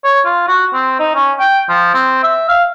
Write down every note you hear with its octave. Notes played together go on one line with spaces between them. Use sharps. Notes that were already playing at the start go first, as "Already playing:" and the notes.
C#5
F4
F#4
C4
D#4
C#4
G5
F3
C4
E5
F5